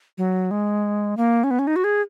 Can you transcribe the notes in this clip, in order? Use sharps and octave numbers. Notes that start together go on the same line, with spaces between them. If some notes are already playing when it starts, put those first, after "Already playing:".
F#3
G#3
A#3
C#4
B3
C#4
D#4
F#4
G#4